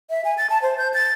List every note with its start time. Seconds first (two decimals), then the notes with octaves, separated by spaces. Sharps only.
0.10 E5
0.25 G#5
0.38 A6
0.50 A5
0.62 C5
0.78 G6
0.94 A6